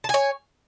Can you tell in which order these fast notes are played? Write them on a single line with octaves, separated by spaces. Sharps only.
A5 G#5 C#5